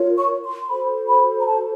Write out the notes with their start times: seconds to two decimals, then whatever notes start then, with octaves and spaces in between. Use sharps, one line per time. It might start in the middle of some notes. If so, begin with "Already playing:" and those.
Already playing: F4 A#4 C#5
0.17 C#6
0.43 C6
0.62 C6
0.68 F#4 A4 C5 B5
1.07 B5
1.40 A#5
1.46 A5